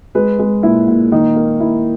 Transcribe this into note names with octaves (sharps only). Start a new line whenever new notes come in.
G#3 B4
G#3
A#2 E4
A#2
D#3 D#4
A#3
A#3 E4